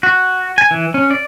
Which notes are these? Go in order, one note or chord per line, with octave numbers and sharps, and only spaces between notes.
F#4
G#5
E3
C#4
D5